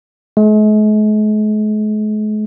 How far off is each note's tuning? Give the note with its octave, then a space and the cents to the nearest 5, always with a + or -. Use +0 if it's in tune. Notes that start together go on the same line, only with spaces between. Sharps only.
G#3 +45